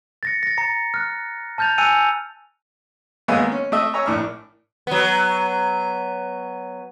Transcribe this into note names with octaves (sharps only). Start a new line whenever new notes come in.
A6 A#6 C#7
A6 A#6
A#5 A6 C#7
F6 F#6
A5 F6 G6 A6 F7
G#5 E6 F#6 C#7 D#7 F7
G#1 G#3 A#3 B3 E5 G#5
C#4
A3 D#5 E5
C#5 E5 G#5 A#5
A#1 A2 D4 F6
F#3 B3